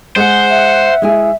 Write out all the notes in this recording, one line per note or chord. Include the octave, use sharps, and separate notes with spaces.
G#3 G#4 C5 F#5
E5
G#3 E4 G#4